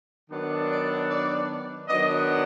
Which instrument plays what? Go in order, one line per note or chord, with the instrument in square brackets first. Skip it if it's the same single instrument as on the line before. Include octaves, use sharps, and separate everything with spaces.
[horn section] D#3 F#3 B3 D4
D5
D5
D#3 F#3 B3 D4 D#5